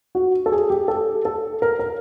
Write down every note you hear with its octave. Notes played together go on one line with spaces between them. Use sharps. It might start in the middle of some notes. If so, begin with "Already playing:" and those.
F#4
A4
G#4
G4
A4
A4
A#4
A#4